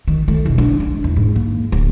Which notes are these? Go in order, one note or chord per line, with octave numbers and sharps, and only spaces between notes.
D#3
A3
E1
D4
D4
E2
G#2
A#3
D1